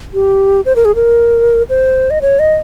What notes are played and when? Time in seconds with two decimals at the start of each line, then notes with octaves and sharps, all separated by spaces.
0.14 G4
0.65 C5
0.76 A#4
0.85 G#4
0.95 A#4
1.69 C5
2.10 D#5
2.22 C#5
2.39 D#5